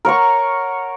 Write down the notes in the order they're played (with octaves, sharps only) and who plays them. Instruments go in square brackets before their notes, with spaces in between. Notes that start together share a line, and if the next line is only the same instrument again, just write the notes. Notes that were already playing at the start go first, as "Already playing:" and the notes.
[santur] A#4 C#5 F#5 C#6